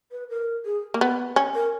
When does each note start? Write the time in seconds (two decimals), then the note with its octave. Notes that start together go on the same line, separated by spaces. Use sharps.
0.12 B4
0.29 A#4
0.65 G#4
0.94 A#3
1.01 B3
1.36 C#4
1.55 A#4